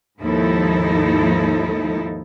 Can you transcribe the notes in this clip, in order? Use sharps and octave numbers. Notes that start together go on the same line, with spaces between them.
D#2 G#2 F3 D#4 E4 A4